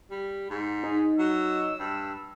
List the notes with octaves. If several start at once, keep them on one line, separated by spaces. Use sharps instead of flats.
G3
G#2
D#4 G#4
F#3 E6
G2